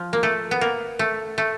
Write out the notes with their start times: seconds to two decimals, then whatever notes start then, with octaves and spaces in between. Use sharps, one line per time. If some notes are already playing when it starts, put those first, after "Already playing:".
Already playing: F3
0.13 A#3
0.23 A3
0.51 B3
0.61 A#3
0.99 A3
1.38 A3